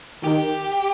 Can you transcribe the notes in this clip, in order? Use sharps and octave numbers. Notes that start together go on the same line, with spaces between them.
D#3 G4